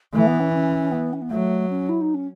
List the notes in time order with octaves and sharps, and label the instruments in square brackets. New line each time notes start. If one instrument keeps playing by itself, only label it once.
[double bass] E3 [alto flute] A3
[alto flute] B3
C#4
C#4
B3
C#4
B3
[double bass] F#3 [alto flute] A3
[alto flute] C#4
E4
D#4
C#4